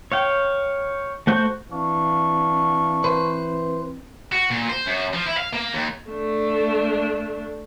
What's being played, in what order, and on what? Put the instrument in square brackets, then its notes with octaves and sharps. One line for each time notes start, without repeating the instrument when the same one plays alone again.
[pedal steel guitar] C#5 F5 G5
A3 F#4 C5 C#6 G6
[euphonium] E3 [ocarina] C4 [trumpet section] D4 F5 C#6
[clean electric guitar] B4 C5
[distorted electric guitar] F#4
A#2
C5
F#2
F3
E4
F5
A#3
D#2
[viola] A3 D4